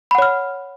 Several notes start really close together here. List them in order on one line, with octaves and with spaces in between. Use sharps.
B5 F#5 C#5 F6